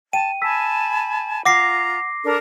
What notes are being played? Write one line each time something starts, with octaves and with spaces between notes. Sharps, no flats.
G5 A5 D#7
G#5 A5 B5 E6 B6
F4 F#5 A#5 D6 A#6 C7
D4 A4 A#4